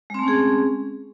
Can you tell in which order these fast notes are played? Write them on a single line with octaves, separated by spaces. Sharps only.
G#3 C4 A3 C#4 G#4